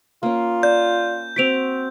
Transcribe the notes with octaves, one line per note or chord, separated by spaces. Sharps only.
A#3 C#4 F4
D5 G6
C4 F#4 B6 D7 F7